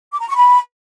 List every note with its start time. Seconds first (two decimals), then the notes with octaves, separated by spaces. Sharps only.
0.12 D6
0.20 A#5
0.28 C#6
0.36 B5